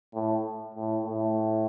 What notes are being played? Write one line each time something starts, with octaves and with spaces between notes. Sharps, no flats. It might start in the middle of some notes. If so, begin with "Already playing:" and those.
A2
A2
A2